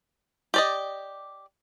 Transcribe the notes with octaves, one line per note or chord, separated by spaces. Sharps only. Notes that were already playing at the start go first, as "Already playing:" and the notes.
G4 D5 D#5